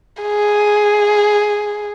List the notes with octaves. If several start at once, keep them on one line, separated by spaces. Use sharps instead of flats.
G#4